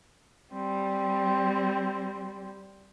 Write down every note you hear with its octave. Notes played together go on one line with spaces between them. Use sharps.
G3 C4